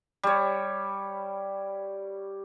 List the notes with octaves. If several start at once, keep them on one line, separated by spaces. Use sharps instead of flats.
G3 C#5